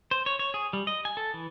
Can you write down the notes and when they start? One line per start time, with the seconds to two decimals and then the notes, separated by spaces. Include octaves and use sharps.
0.11 C5
0.26 C#5
0.39 C#5
0.54 G#4
0.73 G3
0.87 D#5
1.05 G#5
1.17 A4
1.34 E3